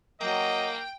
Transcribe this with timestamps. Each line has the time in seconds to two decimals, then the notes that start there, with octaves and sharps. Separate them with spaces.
0.21 F#3 A#3 D#5 G5